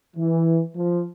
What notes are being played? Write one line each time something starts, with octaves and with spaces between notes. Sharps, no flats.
E3
F3